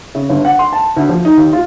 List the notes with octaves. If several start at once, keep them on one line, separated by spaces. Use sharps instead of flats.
C#3
G1
F#5
C6
A5
D2
F3
D#4
D#2
F4